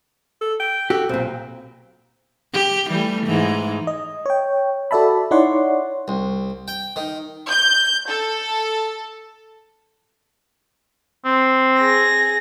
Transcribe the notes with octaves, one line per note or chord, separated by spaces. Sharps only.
A4
G5
F#4 G4 A4
B1 A#2 C4
G4
E3 G3 A3
G#2 E3
D#5
C#5 G5
F#4 A4 D5 E5 A5 B5
D#4 E4 C#5 D5 F#5 C6
C2
G5
D#3
G6
A4
C4
G#4 A#6